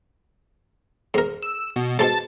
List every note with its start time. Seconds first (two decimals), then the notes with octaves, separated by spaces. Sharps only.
1.14 G#2 A#4
1.43 E6
1.76 B2
1.99 G#2 B2 A5 A6